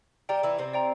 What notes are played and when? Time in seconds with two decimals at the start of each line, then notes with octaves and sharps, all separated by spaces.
0.29 G3 G4 D5 G5 A#5
0.43 E3 E4
0.58 C3 C4
0.73 D5 G5 A#5